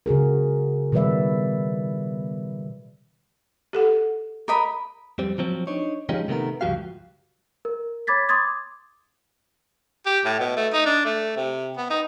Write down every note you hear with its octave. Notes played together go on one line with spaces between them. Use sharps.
C#3 F#4 G#4 A#4
B2 D#3 G3 B4 D5 E5
G4 A4 F#5
A#4 D#5 B5
F2 G3 C4
F3 F#3 C4
D4 D#4 C#5
F3 G#3 C#4 D#4 F4 G4
C3 D#3 A3 B3 A#4
C#2 G2 F3 F#4 G4 F5
A#4
C#5 B5 D6 G#6 A6 B6
C6 D6 D#6 G#6 A6
G4
A2
B2
A3
D#4
D4
A3
C3
B3
D#4